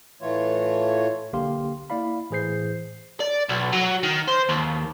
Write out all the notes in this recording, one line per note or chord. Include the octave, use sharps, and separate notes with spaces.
A2 E3 A3 F4 C#5
B1 D3 A#3 G4 F5 C6
A#3 E4 D5 F5 B5
A2 E3 G#4 C5 G6 C7
D5
B1
F#3
D#3
C5
D#2